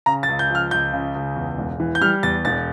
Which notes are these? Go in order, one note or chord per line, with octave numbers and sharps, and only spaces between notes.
C#3 A#5
A6
C#2
G6
F3 F6
C#2 G6
C#3
C#2
E2
E1
E3
G6
G3 F6
E2 A6
E1 A6